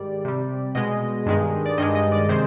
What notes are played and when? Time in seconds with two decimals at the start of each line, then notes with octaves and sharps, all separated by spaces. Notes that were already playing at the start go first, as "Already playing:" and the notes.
Already playing: G#2 D#3 G3 D5
0.25 C3 G3
0.75 B2 G#3 D#5
1.26 G2 D#3 G#3
1.66 D5
1.78 G2 D#3 G#3 D#5
1.95 D#5
2.12 D5
2.29 C3 D#3 G#3 C5